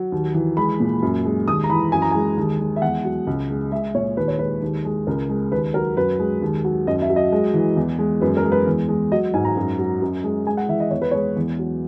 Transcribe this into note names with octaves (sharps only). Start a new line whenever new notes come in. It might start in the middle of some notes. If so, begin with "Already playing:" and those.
Already playing: F#3
D#2
E3
G#3 B5
A#2
F#2
G#3
D#2 D#6
A#5
E3 B5
F#2 G#5
A#5
G#3 G#5
D#2
G#3
E5
E2 F#5
F#3
C#2
G#3
G#3 E5
A#2 C#5
D#2 B4
C#5
G#3 B4
D#2
G#3
C#2 A#4
G#3
D#2 B4
F#3 A#4
F#2 B4
G#3
D#2
F#3
F#2 D#5
E5
F#3
D#5
G#3
E3
E2
G#3
F#2 B4
A#4
G#3
B4
E2
G#3
F#3 D#5
G#2 G#5
A#5
F#2
F#3
F#2
G#3
G#3 G#5
F#5
E3 E5
D#5
E2 C#5
B4
G#3 C#5
E2
F#3